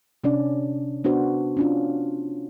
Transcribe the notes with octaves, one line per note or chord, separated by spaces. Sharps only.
C3 C#4 D4 D5
B3 D4 F#4 C5
C#4 D4 F4